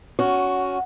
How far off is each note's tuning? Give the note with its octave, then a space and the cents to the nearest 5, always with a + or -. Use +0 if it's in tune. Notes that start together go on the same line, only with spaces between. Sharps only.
C#4 +15 F#4 +0